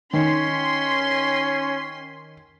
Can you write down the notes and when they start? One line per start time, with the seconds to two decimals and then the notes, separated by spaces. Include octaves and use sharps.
0.13 D#3 C#4 C6 B6